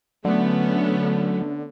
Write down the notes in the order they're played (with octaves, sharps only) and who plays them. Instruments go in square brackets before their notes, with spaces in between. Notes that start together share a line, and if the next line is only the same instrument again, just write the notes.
[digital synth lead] D3 [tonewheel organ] F#3 [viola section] A3 B3 C#4